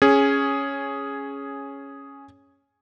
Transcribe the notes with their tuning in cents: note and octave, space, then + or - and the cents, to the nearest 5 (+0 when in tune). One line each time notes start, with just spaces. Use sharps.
C#4 +0 G#4 +0